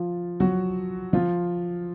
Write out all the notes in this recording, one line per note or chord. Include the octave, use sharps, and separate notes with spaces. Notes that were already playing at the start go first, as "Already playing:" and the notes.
Already playing: F3 F4
F#3 F#4
F3 F4